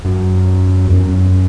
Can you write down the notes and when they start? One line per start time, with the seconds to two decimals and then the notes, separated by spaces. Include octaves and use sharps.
0.05 F#2
0.87 E2
0.94 F#2